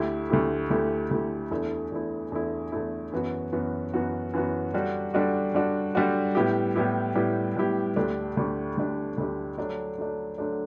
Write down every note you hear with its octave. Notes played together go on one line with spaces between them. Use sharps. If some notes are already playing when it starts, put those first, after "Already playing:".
Already playing: D2 D3 A3 E4 G4
D2 D3 A3 E4 G4
D2 D3 A3 E4 G4
D2 D3 A3 E4 G4
E2 D3 A3 E4
E2 D3 A3 E4
E2 D3 A3 E4
E2 D3 A3 E4
F#2 E3 B3 F#4
F#2 E3 B3 F#4
F#2 E3 B3 F#4
F#2 E3 B3 F#4
D3 G3 D4 F#4
D3 G3 D4 F#4
D3 G3 D4 F#4
D3 G3 D4 F#4
A2 G3 B3 E4 G4
A2 G3 B3 E4 G4
A2 G3 B3 E4 G4
A2 G3 B3 E4 G4
D2 D3 A3 D4 G4
D2 D3 A3 D4 G4
D2 D3 A3 D4 G4
D2 D3 A3 D4 G4
D3 F#3 A3 D4
D3 F#3 A3 D4
D3 F#3 A3 D4